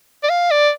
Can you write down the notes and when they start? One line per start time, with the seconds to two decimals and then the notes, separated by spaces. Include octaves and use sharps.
0.23 D5
0.29 F5
0.51 D5